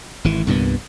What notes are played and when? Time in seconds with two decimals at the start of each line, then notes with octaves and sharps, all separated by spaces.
0.24 G#1 E3
0.47 C2 G2 A#2 B3